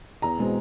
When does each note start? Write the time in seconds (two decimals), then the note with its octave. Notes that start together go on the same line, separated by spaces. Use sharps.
0.22 E2 A#5
0.38 B2 G#3 C4